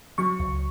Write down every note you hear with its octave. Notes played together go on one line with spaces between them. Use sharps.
F#3 C#6
C#2